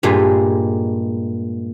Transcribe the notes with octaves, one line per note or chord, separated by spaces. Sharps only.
G2 A#2 G#3